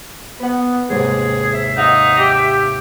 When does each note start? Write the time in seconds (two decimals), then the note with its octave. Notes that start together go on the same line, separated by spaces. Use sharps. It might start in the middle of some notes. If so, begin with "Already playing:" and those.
0.40 B3 B4 F#5
0.89 D#2 G#2 C3 G#4
1.54 E5
1.77 D#4 G#4 F5 F#5
2.18 G4